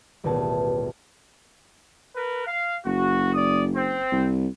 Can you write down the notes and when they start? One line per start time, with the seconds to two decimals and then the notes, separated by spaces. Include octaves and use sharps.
0.24 D#1 A1 B2 G#4 A5 A6
2.16 A#4 B4
2.47 F5
2.85 F#1 F#4
3.34 D5 D#6
3.75 C4
4.12 C2